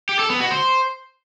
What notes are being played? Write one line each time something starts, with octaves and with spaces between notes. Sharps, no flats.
G4
A4
B3
F#4
C5